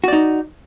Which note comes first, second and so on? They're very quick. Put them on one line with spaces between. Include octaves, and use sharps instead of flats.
F#4 D5 D#4